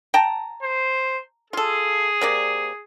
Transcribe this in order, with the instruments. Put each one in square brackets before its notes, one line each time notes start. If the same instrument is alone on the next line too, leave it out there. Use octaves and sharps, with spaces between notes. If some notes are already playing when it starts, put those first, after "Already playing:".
[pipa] G5 A5 A#5
[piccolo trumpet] C5
[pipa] F4 A4 [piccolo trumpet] G#4
[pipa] C3 A#3 D5